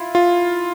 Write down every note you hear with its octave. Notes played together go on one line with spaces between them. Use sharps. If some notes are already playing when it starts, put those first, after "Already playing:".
Already playing: E4 F4
F4